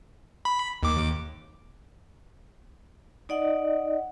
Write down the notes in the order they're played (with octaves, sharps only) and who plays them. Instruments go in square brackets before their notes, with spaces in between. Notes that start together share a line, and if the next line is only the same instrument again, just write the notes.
[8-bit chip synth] B5
D#2 D6
[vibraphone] D#4 D5 D#5 F#5